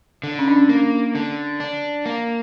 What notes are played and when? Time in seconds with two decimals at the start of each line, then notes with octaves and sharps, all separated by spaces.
0.23 D3
0.39 C#4
0.48 D4
0.56 C#4
0.69 A#3
1.15 D3
1.60 D4
2.06 A#3